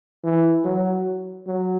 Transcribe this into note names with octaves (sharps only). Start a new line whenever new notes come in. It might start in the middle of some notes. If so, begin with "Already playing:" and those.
E3
F#3
F#3